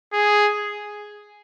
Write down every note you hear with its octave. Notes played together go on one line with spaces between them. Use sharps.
G#4